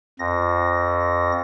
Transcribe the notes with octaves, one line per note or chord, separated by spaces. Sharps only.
F2 A#6